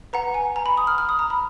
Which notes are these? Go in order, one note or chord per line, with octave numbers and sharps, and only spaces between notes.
B4 F#5 A#5
G#5
A#5
B5
D#6
F6
F6
D#6
A#5
B5